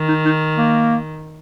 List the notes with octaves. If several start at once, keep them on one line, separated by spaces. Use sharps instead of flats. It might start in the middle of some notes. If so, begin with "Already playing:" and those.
Already playing: D#3
D#4
D#4
A#3